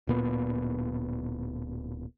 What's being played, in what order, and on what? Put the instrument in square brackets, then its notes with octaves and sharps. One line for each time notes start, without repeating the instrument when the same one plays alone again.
[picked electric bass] D1 A#2 B3